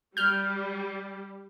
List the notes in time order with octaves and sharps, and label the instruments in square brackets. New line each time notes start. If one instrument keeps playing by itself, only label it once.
[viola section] G3 [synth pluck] F6 G6